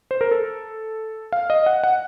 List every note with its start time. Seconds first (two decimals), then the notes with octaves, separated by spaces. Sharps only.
0.11 C5
0.21 A#4
0.31 A4
1.32 F5
1.50 D#5
1.66 F#5
1.84 F#5